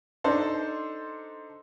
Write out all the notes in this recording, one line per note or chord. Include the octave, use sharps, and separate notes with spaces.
D4 D#4 A4 C5